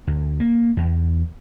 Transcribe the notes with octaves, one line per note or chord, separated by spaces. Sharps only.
D2
A#3
E2